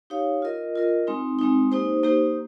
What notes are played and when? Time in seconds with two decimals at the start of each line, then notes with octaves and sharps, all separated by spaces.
0.10 D#4 G4 C#5 F5
0.42 F4 A#4 D#5
0.76 F4 A#4 D#5
1.07 G#3 C4 D#4
1.39 G#3 C4 D#4
1.72 A#3 D#4 G4 C5
2.03 A#3 D#4 G4 C5